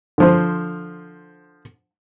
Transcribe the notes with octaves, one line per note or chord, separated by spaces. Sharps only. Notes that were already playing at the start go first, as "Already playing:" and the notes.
D3 F3 C5